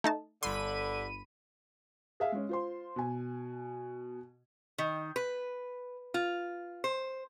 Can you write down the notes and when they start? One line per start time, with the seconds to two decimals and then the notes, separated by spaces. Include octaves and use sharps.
0.04 A3 D#4 A5
0.43 G1 D3 B5 C6 D#7
2.20 G#4 E5 F5
2.32 G#3 C#4
2.49 F4 C5 C6
2.96 B2 G#5
4.78 D#3
5.16 B4
6.14 F4
6.84 C5